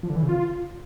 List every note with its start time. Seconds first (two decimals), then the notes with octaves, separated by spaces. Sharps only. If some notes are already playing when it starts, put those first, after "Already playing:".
0.03 F3
0.10 D3
0.16 E3
0.22 C#3
0.29 F4